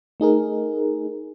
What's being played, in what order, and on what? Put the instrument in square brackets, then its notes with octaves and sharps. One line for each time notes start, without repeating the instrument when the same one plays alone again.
[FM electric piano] A3 D#4 G#4 A#4